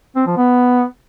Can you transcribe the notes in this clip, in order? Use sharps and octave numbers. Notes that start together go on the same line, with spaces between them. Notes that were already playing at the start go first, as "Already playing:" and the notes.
C4
F3
B3